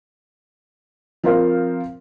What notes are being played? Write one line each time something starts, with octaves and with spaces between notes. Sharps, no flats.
F3 C4 A#4 C5 F5